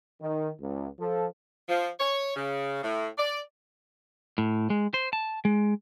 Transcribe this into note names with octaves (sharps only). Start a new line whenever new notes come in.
D#3
C#2
F3 A4
F3
C#5
C#3
A2
D5
A2
G#3
C5
A5
G#3